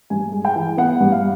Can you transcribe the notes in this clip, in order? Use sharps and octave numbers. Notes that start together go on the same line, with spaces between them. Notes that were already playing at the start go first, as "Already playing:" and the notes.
G2 G#5
G#3
G5
E3
B3 F#5
G2
F5